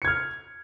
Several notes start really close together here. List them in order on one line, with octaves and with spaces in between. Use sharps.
C#7 G#6 F6